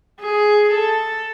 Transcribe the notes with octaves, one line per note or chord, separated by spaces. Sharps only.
G#4
A4